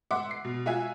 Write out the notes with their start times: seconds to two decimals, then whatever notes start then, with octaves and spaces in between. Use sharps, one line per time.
0.11 E5 F#5 C6 D6
0.31 C7
0.44 B2
0.66 F4 F#4 E5 G#5